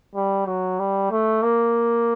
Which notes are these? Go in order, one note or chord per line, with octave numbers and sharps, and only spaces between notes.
G3
F#3
G3
A3
A#3